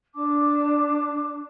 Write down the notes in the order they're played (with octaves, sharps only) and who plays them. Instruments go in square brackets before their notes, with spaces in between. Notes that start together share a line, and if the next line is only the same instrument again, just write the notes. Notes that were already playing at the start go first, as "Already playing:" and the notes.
[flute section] D4 A5 D6